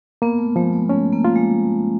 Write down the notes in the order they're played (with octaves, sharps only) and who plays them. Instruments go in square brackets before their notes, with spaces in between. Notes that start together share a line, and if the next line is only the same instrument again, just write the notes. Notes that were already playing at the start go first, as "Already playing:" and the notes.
[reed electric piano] A#3 [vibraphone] B3
[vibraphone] A3
[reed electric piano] F3 [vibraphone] G#3
[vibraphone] A3
[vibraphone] A3 [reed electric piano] C#4
[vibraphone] A#3
[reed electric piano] F4
[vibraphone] G#3